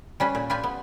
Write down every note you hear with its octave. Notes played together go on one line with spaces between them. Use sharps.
G3 C#4 B4
A#2
F4 G4 B4 G#5
B3